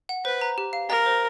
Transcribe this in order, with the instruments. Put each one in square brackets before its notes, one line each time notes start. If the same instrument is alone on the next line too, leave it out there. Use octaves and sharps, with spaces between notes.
[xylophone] F#5
[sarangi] B4 [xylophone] C5
[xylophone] A#5
G4
F5
[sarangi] A#4 [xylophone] A#5
[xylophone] C5